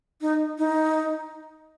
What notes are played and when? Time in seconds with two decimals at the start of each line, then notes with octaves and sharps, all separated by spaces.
0.21 D#4
0.58 D#4